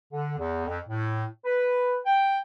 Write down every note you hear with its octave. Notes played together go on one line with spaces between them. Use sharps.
D3
E2
F2
A2
B4
G5